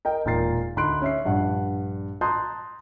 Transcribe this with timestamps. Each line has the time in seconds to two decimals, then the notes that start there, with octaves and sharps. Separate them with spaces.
0.05 A#4 D#5 G5
0.25 E1 A#2 D#4 A#4 A6 C7
0.76 D2 D#4 B5 C6 F#6 D7
1.02 C#4 E5 C7
1.25 A#1 G2 F#5
2.21 A5 A#5 C6 D#6 F#6 G6